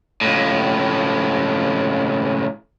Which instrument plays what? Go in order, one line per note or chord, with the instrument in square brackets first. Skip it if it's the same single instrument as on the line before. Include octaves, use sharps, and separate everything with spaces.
[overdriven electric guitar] C#2 A2